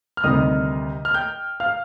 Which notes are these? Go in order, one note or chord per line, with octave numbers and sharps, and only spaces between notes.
F6
D2 C3 D#3 G3 D#5 D#6
F6
G5 G6
F5 F6